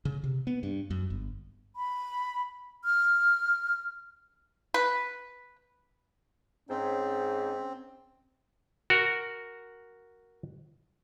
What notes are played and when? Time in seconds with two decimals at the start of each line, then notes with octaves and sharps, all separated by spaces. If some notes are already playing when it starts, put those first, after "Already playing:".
0.05 C#3
0.24 C3
0.47 B3
0.63 G2
0.91 F#2
1.10 G1
1.76 B5
2.84 F6
4.74 B4
6.69 G#2 C4 C#4
8.90 F#4 A#4